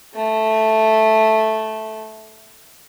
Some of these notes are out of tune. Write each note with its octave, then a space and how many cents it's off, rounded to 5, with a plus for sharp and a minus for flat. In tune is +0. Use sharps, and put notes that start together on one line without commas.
A3 -5